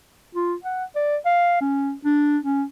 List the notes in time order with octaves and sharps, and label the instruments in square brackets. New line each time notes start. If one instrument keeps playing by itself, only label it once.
[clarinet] F4
F#5
D5
F5
C#4
D4
C#4